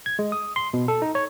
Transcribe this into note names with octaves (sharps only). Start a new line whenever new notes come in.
G#6
G#3
D#6
C6
B2
A4
D#4
C#5